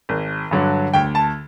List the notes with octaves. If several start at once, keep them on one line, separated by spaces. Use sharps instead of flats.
G#1
G2 D3 F#3
D2 G5
A5